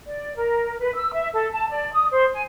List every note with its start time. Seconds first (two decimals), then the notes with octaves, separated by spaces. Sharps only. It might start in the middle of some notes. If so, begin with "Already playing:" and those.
0.06 D5
0.36 A#4
0.79 B4
0.95 E6
1.13 E5
1.33 A4
1.52 A5
1.70 D5
1.93 D#6
2.10 C5
2.33 G#5